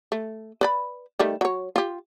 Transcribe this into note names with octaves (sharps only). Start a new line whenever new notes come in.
A3
B4 D5 B5
D#3 G3 A3
F#3 C#5
F4 G4